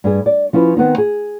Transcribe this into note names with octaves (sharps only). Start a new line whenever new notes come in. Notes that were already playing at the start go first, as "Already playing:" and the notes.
G2 G#4
D5
F3 C#4 E4 B4
D#3 B3 C4 D#4
G#4